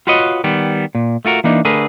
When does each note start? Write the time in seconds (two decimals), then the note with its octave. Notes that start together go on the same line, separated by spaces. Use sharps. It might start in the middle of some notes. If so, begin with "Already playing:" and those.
0.07 F4 F#4 B4 C#5 D#5
0.44 D#3 G3 B3
0.95 A#2
1.25 A3 F4 F#4 A#4
1.44 E3 A#3 D4 D#4
1.65 D3 A3 G#4 A#4 B4